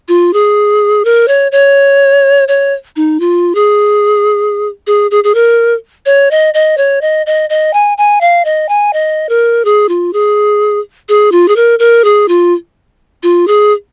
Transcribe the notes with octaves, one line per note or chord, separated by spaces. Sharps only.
F4
G#4
A#4
C#5
C#5
C#5
D#4
F4
G#4
G#4
G#4
G#4
A#4
C#5
D#5
D#5
C#5
D#5
D#5
D#5
G#5
G#5
F5
D#5
G#5
D#5
A#4
G#4
F4
G#4
G#4
F4
G#4
A#4
A#4
G#4
F4
F4
G#4